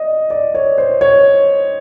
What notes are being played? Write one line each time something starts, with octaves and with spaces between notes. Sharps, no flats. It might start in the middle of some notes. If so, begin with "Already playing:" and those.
Already playing: D5 D#5
D5
C#5
C5
C#5